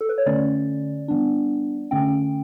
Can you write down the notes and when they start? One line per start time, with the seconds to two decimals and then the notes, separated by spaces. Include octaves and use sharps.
0.01 A4
0.09 B4
0.18 C#5
0.26 D3 A3 C#4 D5
1.08 E3 G3 B3 D4
1.91 D3 A3 C#4 G5